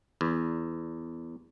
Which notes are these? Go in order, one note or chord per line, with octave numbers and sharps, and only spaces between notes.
E2